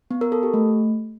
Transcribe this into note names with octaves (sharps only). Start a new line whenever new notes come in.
B3
A#4
A4
G4
A3